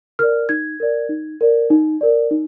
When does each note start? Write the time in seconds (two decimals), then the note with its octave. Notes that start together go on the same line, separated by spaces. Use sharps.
0.19 A#4 D5 F6
0.49 D#4 G#6
0.80 A#4 D5
1.09 D#4
1.41 A#4 D5
1.70 D#4
2.01 A#4 D5
2.31 D#4